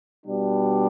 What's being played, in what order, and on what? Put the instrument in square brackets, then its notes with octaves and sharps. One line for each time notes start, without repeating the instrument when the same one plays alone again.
[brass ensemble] B2 G3 D4